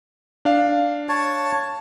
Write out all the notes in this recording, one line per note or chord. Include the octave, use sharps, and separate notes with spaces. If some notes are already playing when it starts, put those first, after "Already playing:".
D4 F5
C#5 A5